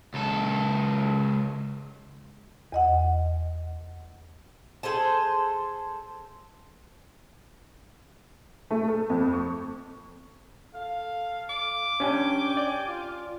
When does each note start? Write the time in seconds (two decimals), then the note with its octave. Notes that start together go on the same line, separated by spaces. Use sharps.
0.14 C#2 A4
2.72 E2 D#5 F#5
4.83 G#4 A4 C5 A5
8.71 A3
8.88 A4
9.10 F2
9.33 C#6
10.74 A4 F5
11.50 D6
12.00 C#4 D4 G4 G5 G#5
12.57 D5
12.88 F4